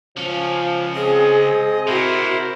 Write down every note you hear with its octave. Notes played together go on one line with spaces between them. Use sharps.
C#2 F3 C#4
C4 G#4 D#5
C3 E4 F#4 A#4 C5